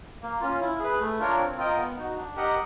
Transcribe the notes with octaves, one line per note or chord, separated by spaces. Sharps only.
A#3
C#4 F4
E4
G#4 B4
A3
D4 F4 A#4 C#5
C4
F4 A#4 D#5 G5
B3
D#4 F#4
D4
G4 A#4 D#5 F#5